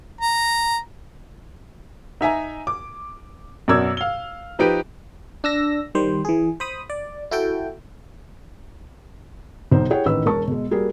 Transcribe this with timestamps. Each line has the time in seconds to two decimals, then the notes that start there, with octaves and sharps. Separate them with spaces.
0.21 A#5
2.21 D#4 E5 G#5 A#5
2.67 D6
3.68 F#2 B2 A#4 D5 E6 G#6
3.97 F5 G7
4.59 F3 D#4 G4 B4 D7
5.44 D4 E6 A#6
5.95 D#3 G3 C5
6.25 E3 G#4
6.60 C5 B5 D#6
6.90 D5
7.31 E4 F#4 A4 G5
9.72 B1 D#4 C5
9.90 E4 G4 G#4 C#5 F#5 G5
10.05 A1 D#3 E3 B4 E6
10.26 E1 A#4 A5 C#6
10.47 B2 G#3
10.71 G3 A#3 F#4 G#4 A#4